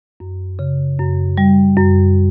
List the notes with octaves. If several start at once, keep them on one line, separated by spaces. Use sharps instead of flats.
F#2
C#3
F#2
G3
F#2